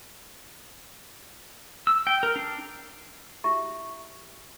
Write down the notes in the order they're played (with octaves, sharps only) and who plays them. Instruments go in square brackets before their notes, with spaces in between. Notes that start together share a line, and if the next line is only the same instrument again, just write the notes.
[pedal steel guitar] E6
G5
A#4
D4
[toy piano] E4 F#4 G4 E5 A#5 C#6